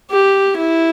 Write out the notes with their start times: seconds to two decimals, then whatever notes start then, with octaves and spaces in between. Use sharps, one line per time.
0.11 G4
0.57 E4